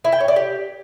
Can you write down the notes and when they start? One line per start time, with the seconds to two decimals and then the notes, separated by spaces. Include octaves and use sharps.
0.05 E4
0.12 G5
0.20 C#5
0.28 D5
0.36 G4